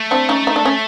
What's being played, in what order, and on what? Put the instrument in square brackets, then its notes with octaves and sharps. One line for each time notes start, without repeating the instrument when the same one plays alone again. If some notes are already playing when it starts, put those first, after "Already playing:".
Already playing: [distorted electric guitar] A3
[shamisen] C4 D4
C#4 D#4
D#4
D4
C#4